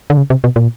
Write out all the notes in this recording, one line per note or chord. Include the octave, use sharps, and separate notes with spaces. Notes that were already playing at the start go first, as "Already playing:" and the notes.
D3
C#3
C3
B2
A#2